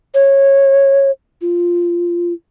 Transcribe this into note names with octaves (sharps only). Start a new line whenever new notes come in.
C#5
F4